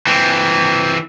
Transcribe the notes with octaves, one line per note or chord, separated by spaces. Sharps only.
E3 C4